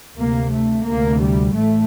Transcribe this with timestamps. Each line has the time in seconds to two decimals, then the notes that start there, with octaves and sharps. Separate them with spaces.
0.18 D2 C3 A#3
0.52 A3
0.86 D2 C3 A#3
1.20 G3
1.54 A1 A2 A3